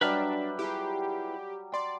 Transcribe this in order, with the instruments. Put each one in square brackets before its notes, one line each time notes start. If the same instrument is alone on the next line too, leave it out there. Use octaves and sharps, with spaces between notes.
[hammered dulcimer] F#3 G3 [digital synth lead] D4 [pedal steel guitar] B4 E5 F6
[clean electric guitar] E4 F4 G#4 [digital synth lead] G4
[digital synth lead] D5 [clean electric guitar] C6